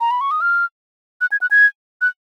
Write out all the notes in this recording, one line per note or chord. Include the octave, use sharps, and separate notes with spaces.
A#5
B5
C#6
D#6
F6
F#6
G#6
F#6
G#6
F#6